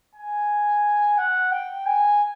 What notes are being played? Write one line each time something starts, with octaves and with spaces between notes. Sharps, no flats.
G#5
F#5
G5
G#5